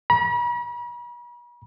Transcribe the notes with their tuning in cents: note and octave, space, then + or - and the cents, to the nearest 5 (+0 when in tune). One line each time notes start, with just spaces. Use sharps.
B5 -45